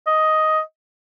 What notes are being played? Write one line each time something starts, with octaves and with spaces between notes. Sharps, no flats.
D#5